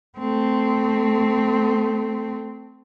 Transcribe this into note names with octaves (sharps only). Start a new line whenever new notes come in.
A3 C4